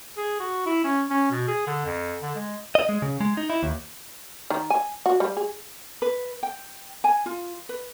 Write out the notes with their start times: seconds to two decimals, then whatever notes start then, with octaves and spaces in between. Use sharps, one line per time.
0.17 G#4
0.40 F#4
0.66 E4
0.84 C#4
1.10 C#4
1.31 B2
1.48 G#4
1.67 D3
1.85 F2
2.22 D3
2.35 G#3
2.75 D#5
2.89 G#3
3.02 C#3
3.21 G#3
3.37 D#4
3.50 E4
3.63 D#2
4.50 D#3
4.70 G#5
5.06 F#4
5.20 G3
5.37 G#4
6.02 B4
6.43 G5
7.04 G#5
7.26 F4
7.69 B4